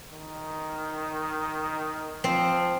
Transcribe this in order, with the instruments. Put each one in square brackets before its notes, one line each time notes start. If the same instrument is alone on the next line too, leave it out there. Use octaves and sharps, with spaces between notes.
[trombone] D#3
[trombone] F3 [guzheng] C4